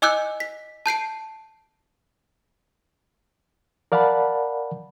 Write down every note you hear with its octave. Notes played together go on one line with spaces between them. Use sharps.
D#5 G#5 D6 E6 F#6 G6
B6
A5 G6 C7 D7
A#4 D5 F5 F#5 A5 B5